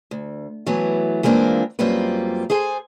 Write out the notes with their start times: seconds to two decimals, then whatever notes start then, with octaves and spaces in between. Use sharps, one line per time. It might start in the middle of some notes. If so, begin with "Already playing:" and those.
0.11 D2
0.66 E3 F#3 A3 B3
1.23 E3 G#3 A#3 C4 D4 F4
1.79 F#2 G3 A#3 C4 F4 B4
2.50 G#4 A4 C5 G#5